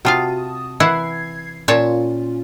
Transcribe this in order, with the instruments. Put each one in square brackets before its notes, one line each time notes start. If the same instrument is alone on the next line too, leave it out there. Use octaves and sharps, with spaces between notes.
[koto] C3 F4 F5 [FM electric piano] F#4 A5 D#6
[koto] E3 E4 F#5 [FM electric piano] G#6 C7
[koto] A#2 C#5 A5 [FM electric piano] C#4 F4